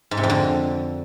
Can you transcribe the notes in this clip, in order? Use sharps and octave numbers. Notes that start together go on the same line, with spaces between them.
G#2
C3
F2
D3